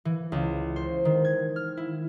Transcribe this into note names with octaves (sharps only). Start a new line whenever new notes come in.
E3
C#2
C5
D#3
G#6
F6
E4